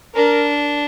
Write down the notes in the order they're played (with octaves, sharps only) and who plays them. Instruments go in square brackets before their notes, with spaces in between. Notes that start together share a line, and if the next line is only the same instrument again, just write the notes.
[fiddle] D4 [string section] A#4